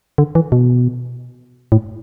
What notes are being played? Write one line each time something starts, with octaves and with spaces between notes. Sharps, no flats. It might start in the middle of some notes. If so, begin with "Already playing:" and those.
D3
E3
B2
A2